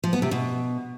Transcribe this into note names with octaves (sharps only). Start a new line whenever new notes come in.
F3
B3
C3
B2